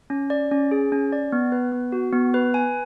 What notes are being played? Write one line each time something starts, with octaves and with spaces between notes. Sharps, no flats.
C#4
D5
C#4
G#4
C#4
D5
B3
B4
B3
F#4
B3
B4
G#5